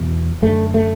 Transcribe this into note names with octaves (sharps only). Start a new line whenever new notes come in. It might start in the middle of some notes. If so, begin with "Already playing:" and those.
Already playing: E2 B2
F#2 D3 A3
A3